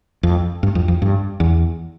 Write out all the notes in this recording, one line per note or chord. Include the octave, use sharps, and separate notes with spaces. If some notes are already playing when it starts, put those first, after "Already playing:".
F2
G2
F2
F2
G2
E2